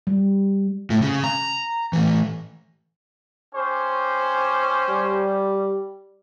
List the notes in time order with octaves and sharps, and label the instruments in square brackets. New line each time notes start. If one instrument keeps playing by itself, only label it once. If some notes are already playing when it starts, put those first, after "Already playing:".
[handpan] G3
[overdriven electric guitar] A2
C#3
A#5
A2 E3
[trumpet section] C#4 G4 C5
[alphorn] G3